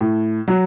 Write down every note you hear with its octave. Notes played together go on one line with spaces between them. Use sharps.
A2
F#3